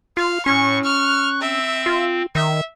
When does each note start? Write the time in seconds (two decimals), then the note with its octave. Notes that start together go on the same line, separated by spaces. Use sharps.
0.17 F4 F5
0.46 A2 C#4 C#6
0.85 C#6 F6 F#6
1.41 C4 E5
1.86 F4
2.35 D#3 E5